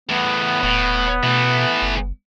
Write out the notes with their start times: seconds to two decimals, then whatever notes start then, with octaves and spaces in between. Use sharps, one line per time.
0.09 E2 A2 B3
0.63 D#1 A2
1.23 B2 E3 A3
1.82 F#1